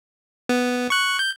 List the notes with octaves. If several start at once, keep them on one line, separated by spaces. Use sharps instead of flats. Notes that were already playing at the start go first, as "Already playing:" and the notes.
B3
C#6 F#6
G6